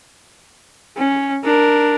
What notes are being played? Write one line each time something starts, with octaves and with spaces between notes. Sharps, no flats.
C#4
D4 A#4